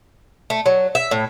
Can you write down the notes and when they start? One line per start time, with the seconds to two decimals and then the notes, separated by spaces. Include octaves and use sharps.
0.50 A3
0.66 F#3
0.95 E5
1.11 A2